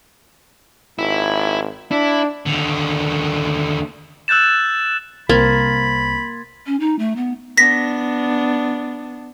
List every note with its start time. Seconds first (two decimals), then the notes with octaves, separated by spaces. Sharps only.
0.99 G#1 E4
1.91 D4 E4
2.47 D#2 D3
4.28 E6 F#6 G6 A6 E7
5.29 C2 A#3 C4 B5 C6 G#6 A6
6.66 C#4
6.80 D#4
6.99 A3
7.16 B3
7.58 B3 D4 A#6 B6